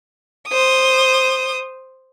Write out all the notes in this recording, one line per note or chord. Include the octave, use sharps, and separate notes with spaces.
C5 D#6